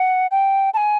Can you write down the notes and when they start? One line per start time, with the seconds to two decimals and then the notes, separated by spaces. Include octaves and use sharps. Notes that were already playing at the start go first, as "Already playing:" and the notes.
Already playing: F#5
0.31 G5
0.74 A5
0.77 G#5